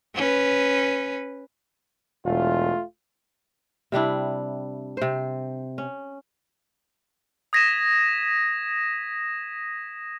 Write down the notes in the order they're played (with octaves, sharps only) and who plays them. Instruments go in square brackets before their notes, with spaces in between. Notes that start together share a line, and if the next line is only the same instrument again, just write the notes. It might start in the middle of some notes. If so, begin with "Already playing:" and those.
[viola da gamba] C#4 B4
[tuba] E1 [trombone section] A3 F4
[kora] C3 G3 D4 E4
C3 C5
C#4
[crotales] D#6 G#6 A#6 B6 D#7 E7